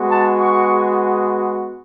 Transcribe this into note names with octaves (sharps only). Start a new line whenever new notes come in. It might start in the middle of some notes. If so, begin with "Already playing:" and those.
Already playing: G#3 B3 F#4
A5
C#6